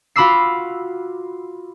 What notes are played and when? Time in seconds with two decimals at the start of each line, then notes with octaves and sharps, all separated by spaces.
0.16 F4 F#4 B5 D6 E6 C7